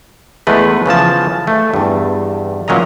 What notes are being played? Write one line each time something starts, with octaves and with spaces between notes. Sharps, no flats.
E2 G#3 A3 B4
C#3 E3 F3 A5
A3
E2 G2
A#2 F#3 C#4 D#5 A#5